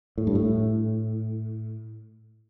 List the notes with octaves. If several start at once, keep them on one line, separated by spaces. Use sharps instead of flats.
A2
G2
A2